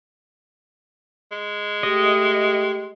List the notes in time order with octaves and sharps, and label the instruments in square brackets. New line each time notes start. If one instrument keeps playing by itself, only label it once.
[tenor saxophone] G#3
[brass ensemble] A3 G4 [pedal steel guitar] D#5